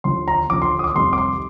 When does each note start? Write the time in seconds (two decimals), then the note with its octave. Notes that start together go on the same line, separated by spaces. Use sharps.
0.04 D#2 D3 F3 C6
0.28 A#5
0.50 D#2 D3 F3 D6
0.62 C6
0.79 D#6
0.84 D6
0.95 F2 C3 D#3 G3 C6
1.13 D6
1.18 C6